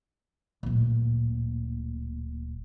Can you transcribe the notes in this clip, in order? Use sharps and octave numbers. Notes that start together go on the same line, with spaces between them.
D1 A#2